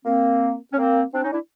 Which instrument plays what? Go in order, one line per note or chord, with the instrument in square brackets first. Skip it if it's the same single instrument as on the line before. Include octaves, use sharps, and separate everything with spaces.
[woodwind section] A#3 C4
C#4
A#3 C4
C4 D4
C#4 D#4
D4 E4